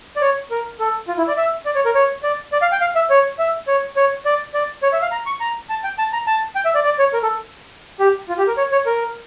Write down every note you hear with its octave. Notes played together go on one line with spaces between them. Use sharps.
D5
C#5
A#4
A4
F4
E4
D5
E5
D5
C#5
A#4
C#5
D5
D5
F5
G5
F5
E5
C#5
E5
C#5
C#5
D5
D5
C#5
E5
F5
A#5
C#6
A#5
A5
G5
A5
A#5
A5
G5
E5
D5
D5
C#5
A#4
A4
G4
F4
G4
A#4
C#5
C#5
A#4